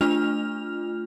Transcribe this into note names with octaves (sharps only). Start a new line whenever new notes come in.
A3 D4 F4 F6 F7